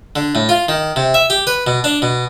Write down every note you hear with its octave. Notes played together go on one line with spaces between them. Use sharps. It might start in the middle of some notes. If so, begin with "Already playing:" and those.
D3
A2
F4
D#3
C3
E5
G4
B4
B2
D4
B2